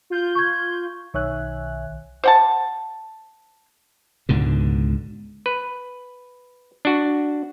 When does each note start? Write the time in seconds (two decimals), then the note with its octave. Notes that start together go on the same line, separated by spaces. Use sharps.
0.10 F4 G6
0.35 C#6 G#6
1.14 B1 D#3 C#5 E5 G#5 F#6
2.24 C5 F#5 A5
4.29 C#2 G#2 B2 D3
5.46 B4
6.85 D4 F#4